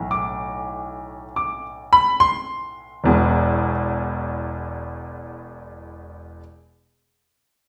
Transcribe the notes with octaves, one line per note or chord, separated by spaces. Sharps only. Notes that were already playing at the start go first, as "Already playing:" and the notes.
Already playing: B1 A2 E3
D6
D6
B5
C6
E1 E2 B2